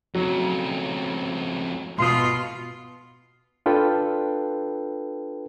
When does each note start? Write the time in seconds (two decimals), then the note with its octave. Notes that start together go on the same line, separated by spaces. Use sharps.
0.15 F2 C#3 F#3
1.98 B2 F4 C6 D#6
3.66 D4 F4 A4 B4 G5